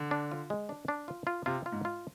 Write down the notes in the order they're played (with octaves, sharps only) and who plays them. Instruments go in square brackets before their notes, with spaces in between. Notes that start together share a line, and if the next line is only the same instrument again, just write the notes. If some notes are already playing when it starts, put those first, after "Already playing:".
Already playing: [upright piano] D3
[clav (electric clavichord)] D4
F4
G#3
D4
D4
F4
F4
[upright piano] C3 [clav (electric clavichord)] F4
[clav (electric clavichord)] F4
[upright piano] G#2
[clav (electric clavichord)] F4